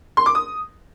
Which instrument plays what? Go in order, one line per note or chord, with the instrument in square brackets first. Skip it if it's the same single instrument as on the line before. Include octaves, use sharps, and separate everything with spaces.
[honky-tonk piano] C6
D6
D#6